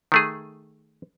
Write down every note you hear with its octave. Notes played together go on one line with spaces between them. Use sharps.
D#3 A3 G#4